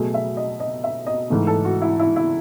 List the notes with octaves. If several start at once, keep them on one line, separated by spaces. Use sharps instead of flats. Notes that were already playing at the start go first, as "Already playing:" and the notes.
Already playing: B2 F#3 A3 G#4
E5
D#5
D#5
E5
D#5
G#2 E3 A3
A4
F#4
E4
E4
E4